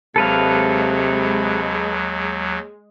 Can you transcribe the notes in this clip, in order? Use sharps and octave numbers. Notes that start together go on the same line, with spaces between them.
D#2 C3 F#3 G#3 A4 B4 F5